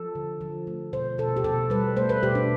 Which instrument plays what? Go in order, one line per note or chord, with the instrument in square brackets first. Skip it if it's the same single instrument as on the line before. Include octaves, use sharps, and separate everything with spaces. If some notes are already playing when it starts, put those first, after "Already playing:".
Already playing: [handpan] F3 A4
D3
F3
A3
B2 C5
B2 A4
G4
B2 A4
G3 B4
A3 C5
B4
B2 G4
D4